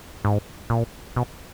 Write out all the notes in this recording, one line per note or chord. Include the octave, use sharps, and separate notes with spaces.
G#2
A#2
B2